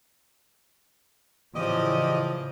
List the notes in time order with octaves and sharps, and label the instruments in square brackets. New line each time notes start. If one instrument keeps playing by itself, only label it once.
[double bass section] A2 C#3 E3 [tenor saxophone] F3 [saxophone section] G4 D5 D#5